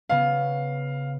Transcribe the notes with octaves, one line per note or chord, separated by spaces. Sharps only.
C#3 B3 C#4 F5